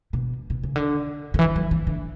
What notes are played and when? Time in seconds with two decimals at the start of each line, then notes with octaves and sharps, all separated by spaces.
0.13 B2
0.50 B2
0.63 C#3
0.76 D3
1.34 D3
1.39 E3
1.56 F#3
1.71 E3
1.87 D3